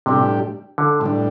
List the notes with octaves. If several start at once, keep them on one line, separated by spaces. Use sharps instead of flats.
A2 C3 G3 D4 G4
D3
A2 G3 D4